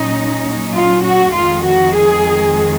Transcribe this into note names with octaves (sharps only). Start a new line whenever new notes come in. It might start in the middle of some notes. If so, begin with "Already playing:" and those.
Already playing: A#2 F#3 C#4 D#4
F4
F#4
F2 D#3 G#3 F4
F#4
G#4